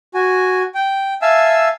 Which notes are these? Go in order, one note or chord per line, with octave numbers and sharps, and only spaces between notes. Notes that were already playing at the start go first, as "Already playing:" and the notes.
F#4 G#5
G5
E5 F5 G#5 A5 E6